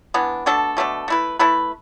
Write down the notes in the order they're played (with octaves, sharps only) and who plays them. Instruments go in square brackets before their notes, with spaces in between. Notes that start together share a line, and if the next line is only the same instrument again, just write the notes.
[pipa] E3 B3 D4
B2 A3 D4 A4
B2 A3 D4 A4
A3 E4 B4
A3 E4 B4